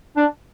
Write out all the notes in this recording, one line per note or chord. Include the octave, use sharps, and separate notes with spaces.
D4